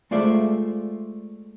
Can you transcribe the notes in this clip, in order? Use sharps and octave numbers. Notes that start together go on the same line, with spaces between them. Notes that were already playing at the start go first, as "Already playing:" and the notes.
G#3 A3 F4 C5 D5 E5